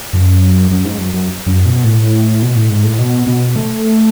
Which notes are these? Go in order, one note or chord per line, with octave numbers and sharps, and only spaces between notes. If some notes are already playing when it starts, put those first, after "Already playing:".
F#2
F#2
G#2
F#2
F#2
F#2
B2
A2
B2
A2
G#2
A2
B2
B2
A3